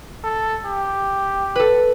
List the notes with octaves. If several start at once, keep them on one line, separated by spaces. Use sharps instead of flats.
A4
G4
A4 B4